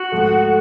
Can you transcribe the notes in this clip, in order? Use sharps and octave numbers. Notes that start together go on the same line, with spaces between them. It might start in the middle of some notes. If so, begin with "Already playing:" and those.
Already playing: F#4
G#2 F3 A3
A3